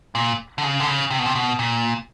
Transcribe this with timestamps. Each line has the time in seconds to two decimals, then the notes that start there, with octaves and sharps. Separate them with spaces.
0.15 A#2
0.58 D3
0.63 C#3
0.80 D3
0.87 C#3
1.10 C3
1.19 B2
1.26 C3
1.35 B2
1.59 A#2